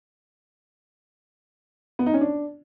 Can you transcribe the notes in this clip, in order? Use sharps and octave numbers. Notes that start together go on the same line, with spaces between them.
B3
D#4
C#4
D4